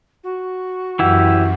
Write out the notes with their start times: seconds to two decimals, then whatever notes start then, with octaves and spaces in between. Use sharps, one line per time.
0.23 F#4
0.99 F#2 E3 E4 G4 F#5